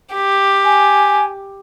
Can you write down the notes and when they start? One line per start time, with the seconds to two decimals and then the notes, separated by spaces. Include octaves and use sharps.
0.14 G4
0.65 G#5